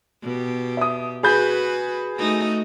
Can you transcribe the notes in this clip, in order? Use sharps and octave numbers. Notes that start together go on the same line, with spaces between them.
B2 G4
E5 D#6
F#4 G#4 B4 B5 G6
A3 D#4 F#4